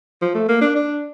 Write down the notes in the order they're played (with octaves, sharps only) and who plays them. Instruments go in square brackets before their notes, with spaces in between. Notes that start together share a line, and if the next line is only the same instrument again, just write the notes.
[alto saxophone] F3
A3
A#3
D4
D4